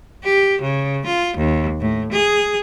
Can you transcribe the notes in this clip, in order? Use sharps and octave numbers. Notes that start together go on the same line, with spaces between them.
G4
C#3
F4
D#2
A2
G#4